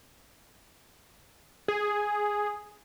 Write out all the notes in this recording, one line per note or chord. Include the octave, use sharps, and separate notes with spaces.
G#4